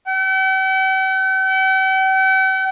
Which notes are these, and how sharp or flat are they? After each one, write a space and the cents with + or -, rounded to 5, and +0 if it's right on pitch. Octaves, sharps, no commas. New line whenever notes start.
G5 -45